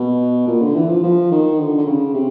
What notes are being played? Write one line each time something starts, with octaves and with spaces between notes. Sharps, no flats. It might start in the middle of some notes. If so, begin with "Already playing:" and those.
Already playing: B2
A#2
D3
E3
F3
F3
D#3
D3
D3
C#3
C3